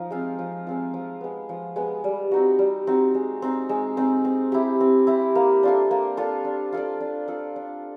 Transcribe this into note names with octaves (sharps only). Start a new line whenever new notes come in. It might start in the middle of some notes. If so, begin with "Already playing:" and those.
Already playing: F3 D#4
G#3 C4 F4
F3
G#3 C4 F4
F3
G#3 B3
F3
G#3 B3
G3
C4 D#4 F#4
G3
C4 D#4 F#4
G#3
C4 D#4
G#3
C4 D#4
C4
E4 G4
C4
E4 G4
A#3
D4 F4 A4
A#3
D4 F4 A4
D4
F4 A4 D5
D4
F4 A4 D5
D4